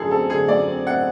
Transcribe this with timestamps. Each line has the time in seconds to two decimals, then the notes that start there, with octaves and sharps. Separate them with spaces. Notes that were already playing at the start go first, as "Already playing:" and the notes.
Already playing: F#2 D3 G#4 A4
0.11 C4 A4
0.30 D3 G#4
0.48 F#2 D5
0.68 C4
0.87 C4 F#5